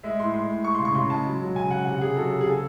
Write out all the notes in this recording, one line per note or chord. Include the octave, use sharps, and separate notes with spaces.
G#3 E5
A2 C6
G#3 C6
A2
G#3 C#6
C6
C#3
C#6
C#3 C6
G#3 A5
F#3
F#3
C#3 G#5
C#3 F#5
C3 F#5
C3 G#4
F#3 A4
C3
G#4
C#3 A4